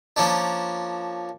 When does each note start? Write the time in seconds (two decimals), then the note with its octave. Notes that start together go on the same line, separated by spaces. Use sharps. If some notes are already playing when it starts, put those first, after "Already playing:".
0.16 F3 A#3 C#4 D4